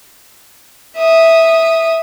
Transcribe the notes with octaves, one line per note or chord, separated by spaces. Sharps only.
E5 D#6